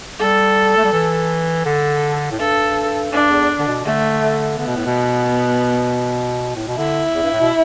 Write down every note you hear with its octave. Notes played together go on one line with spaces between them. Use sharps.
G3 A4
A3
G3
E3
D3 A4
A2
G2 A4
G2 D4
E2
D3
B2
D3 A3
D3 B3
B2
A2
B2
A2
B2
D3 E4
E2
G2
A2
B2